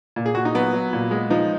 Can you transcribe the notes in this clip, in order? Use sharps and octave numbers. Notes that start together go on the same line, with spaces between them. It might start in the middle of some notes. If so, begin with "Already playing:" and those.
A#2
G#4
A#2 F#4
D#4
F#3 B3
F#3
A#2
G#3
F3 D#4